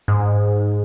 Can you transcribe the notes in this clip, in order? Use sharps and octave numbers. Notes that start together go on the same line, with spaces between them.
G#2